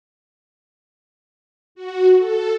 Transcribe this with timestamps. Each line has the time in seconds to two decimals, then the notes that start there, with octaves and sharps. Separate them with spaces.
1.75 F#4
2.16 A4